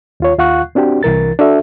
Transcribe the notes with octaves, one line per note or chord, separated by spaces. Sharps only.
D#2 F4 C#5
D#2 F4 F5 F#5 C#6 F#6
C4 D4 F#4 G4
C2 E3 A#4 A6
D4 F#4 A4 E5